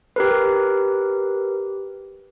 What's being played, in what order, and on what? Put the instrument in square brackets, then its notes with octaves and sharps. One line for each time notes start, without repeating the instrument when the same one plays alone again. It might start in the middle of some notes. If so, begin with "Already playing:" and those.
[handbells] G4 A#4 B4